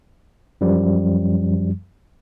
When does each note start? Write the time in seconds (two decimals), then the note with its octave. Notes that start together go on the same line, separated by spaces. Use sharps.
0.61 F#2 F3 G3